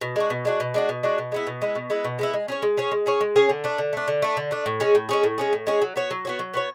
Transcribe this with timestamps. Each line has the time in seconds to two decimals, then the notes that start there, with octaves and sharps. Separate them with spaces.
0.01 B2
0.16 G#3 D4 F#4
0.30 B2
0.45 G#3 D4 F#4
0.60 B2
0.74 G#3 D4 F#4
0.89 B2
1.03 G#3 D4 F#4
1.18 B2
1.32 G#3 B3 E4
1.47 B2
1.62 G#3 B3 E4
1.75 B2
1.90 G#3 B3 E4
2.04 B2
2.19 G#3 B3 E4
2.34 G#3
2.48 C#4 G#4 C#5
2.62 G#3
2.77 C#4 G#4 C#5
2.91 G#3
3.06 C#4 G#4 C#5
3.21 G#3
3.36 C#4 G#4 C#5
3.49 D3
3.64 A3 D4
3.78 D3
3.93 A3 D4
4.08 D3
4.22 A3 D4
4.37 D3
4.51 A3 D4
4.66 A2
4.80 G#3 C#4 G#4
4.95 A2
5.09 G#3 C#4 G#4
5.23 A2
5.38 G#3 C#4 G#4
5.53 A2
5.67 G#3 C#4 G#4
5.82 F#3
5.96 B3 F#4 C#5
6.11 F#3
6.25 B3 F#4 C#5
6.39 F#3
6.54 B3 F#4 C#5